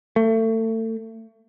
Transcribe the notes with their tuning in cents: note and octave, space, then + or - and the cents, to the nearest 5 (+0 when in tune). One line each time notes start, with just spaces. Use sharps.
A3 +30